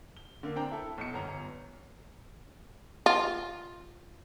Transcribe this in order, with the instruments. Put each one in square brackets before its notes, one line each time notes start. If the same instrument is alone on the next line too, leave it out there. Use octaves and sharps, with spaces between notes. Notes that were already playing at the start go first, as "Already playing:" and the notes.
[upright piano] G7
D3 A#3
C4 D4 G5 A#5
E4 A4
B1 C#6 C#7
G1 F#2 C#4 A#5
[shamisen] F4